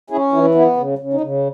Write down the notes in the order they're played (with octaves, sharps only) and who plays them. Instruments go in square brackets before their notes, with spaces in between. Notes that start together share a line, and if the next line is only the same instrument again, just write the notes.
[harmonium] C#4 E4 G#4
E3 E4
B3 E4
C#3
C#3
D#4
C#3